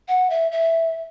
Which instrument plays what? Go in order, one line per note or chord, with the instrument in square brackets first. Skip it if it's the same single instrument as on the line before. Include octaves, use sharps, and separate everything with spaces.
[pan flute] F#5
E5
E5